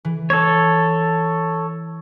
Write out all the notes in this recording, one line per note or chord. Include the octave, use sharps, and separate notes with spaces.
E3
A4 C#5